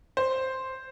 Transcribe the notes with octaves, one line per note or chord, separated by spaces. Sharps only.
C5